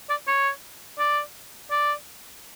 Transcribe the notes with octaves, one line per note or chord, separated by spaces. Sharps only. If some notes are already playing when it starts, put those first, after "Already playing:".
D5
C#5
D5
D5